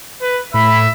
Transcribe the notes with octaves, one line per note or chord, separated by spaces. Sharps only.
B4
A2 E5 B5